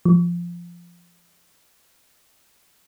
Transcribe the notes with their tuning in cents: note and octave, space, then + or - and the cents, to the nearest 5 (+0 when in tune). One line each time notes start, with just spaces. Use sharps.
F3 -10